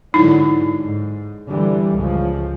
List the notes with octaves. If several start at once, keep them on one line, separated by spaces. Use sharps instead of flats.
G#2 D3 F#3 D#4 E4
G#2
D3 E3 G3
C#2 C#3 F3